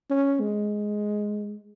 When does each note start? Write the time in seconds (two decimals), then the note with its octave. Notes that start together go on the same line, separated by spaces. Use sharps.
0.10 C#4
0.41 G#3